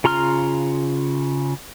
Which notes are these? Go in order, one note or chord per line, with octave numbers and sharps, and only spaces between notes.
C#3 F4 A#5 C6 F6